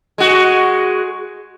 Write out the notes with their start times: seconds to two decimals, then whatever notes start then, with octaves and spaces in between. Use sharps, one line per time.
0.18 G#3 F#4